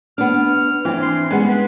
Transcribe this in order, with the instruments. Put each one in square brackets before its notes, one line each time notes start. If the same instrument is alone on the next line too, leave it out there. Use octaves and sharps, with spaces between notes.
[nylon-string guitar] B3 D4 [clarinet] F6
[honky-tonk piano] E3 [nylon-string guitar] C4 D4
[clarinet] C6
[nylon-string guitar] G3 B3 [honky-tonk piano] G#3 [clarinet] C#4
[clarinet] B4